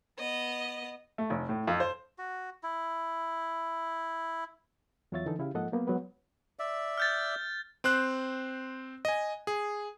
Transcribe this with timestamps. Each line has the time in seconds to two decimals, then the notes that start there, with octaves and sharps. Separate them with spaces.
0.19 B3 D#5
1.18 A3
1.30 F1
1.49 A2
1.67 F2
1.80 C5
2.18 F#4
2.63 E4
5.12 E2 F#3 F4 C#5 E5 A6
5.26 D3 E3 D#4 A4
5.39 C#3 E4 G4 F5
5.54 G#2 F3 A#3 A4 D#5 F#5
5.72 F#3 A#3 B3
5.87 F#3 G#3 B3 B4
6.59 D5 E5
6.98 F6 G6 A6
7.84 C4 C5 F#6
9.05 D#5 G#5
9.47 G#4